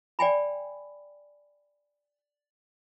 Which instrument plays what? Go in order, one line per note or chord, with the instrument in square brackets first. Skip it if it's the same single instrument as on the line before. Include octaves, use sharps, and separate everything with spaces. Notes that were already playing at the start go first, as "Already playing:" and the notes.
[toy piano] D5 G5 G#5 B5